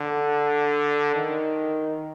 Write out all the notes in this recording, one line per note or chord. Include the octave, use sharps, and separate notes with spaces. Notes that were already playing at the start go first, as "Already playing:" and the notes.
Already playing: D3
D#3